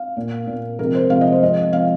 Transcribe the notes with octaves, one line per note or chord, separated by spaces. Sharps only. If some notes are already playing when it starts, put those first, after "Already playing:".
Already playing: F5
A#2 A#3
A#2 A#3
C3 F3 G#3 C4 A#4
C5
C3 F3 G#3 C4 F5
D#5
C5
G#2 F3 C4 D#5
F3 C4 F5